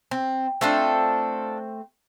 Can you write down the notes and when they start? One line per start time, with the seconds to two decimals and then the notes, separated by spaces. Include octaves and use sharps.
0.11 C4
0.61 A3 C4 D4 F4 A4